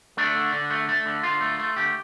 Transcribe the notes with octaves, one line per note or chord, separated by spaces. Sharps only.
A3 D4
D3
D3
A3
A3
D3
D3 F4
A3
A3
D3 G4